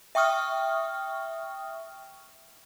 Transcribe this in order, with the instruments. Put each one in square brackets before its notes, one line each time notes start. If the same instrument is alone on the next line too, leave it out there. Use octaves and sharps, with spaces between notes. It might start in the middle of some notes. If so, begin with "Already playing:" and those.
[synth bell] E5 G5 C#6 D#6 F6